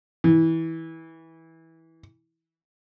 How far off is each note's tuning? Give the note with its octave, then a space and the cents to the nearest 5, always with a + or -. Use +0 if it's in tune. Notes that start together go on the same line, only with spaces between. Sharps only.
E3 -20